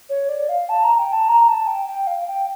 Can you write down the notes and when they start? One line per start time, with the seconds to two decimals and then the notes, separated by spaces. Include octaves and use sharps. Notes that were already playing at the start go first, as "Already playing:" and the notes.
0.09 C#5
0.28 D5
0.49 F5
0.69 A5
0.83 A#5
0.99 G5
1.12 A5
1.28 A#5
1.48 A5
1.67 G5
1.87 G5
2.07 F5
2.27 G5